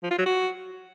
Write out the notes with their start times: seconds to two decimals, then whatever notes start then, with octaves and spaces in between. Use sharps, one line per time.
0.03 F3
0.11 F4
0.18 F#3
0.26 F#4